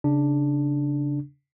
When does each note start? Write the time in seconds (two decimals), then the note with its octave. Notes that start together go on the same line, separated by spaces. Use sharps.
0.04 C#3 D4